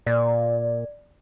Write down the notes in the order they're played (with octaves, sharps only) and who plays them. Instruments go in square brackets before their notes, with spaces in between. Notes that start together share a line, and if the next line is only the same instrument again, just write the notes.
[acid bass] A#2 [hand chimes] D5